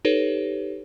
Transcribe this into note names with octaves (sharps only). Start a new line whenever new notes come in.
D#4 G4 A4 B4 C#5